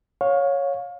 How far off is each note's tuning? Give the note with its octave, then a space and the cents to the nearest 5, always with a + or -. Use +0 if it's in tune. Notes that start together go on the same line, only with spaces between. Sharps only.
C#5 +0 F5 +30